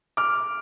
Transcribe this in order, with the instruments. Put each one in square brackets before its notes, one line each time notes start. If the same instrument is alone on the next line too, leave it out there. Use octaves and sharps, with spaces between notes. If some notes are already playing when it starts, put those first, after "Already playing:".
[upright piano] D6 F6